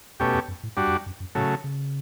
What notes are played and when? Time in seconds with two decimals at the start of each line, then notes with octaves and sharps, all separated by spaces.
0.20 E2 B2 A3 C#4 G4
0.34 E2
0.48 F#2
0.63 A2
0.77 G2 G3 D4 F#4
0.87 E2
0.91 F#2
1.06 F#2
1.20 F#2
1.35 A2 C#3 F#3 A3
1.64 C#3